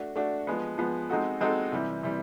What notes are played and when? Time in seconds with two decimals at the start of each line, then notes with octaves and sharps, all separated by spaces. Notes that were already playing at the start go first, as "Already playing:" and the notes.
Already playing: A3 D4 F#4
0.16 A3 D4 F#4
0.47 F3 G#3 B3
0.78 F3 G#3 B3
1.09 G#3 C4 D#4 F#4 A4
1.41 G#3 C4 D#4 F#4 A4
1.72 C3 E3 G3
2.03 C3 E3 G3